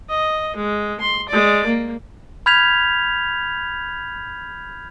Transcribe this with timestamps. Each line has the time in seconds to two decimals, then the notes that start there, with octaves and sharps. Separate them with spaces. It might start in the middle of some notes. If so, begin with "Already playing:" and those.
0.10 D#5
0.57 G#3
1.01 C6
1.29 G#3 D5
1.67 A#3
2.46 B5 F6 G6 G#6 B6 F7